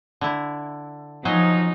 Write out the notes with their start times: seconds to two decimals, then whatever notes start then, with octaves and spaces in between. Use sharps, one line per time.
0.21 D3 E4
1.25 F3 F#3 D#4 G#4 C5